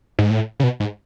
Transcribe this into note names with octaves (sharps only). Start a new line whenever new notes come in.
G#2
A2
C#3
B2
G#2